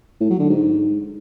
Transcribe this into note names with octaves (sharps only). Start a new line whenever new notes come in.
A2
F#3
D3
G#2